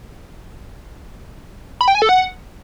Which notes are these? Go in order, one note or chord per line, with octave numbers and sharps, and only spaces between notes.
B5
G5
G#5
A4
F#5